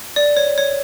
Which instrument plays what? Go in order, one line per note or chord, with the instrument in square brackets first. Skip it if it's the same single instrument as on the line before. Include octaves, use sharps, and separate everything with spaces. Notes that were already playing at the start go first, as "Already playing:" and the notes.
[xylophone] D5
C#5
C#5